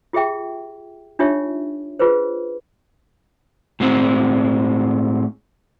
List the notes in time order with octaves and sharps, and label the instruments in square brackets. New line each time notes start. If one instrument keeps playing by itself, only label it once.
[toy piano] F4 G4 G#4 E5 G5
D4 D#4 F4 G4 C#5 E5
F4 G#4 B4 C5
[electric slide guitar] A2 G#3 C4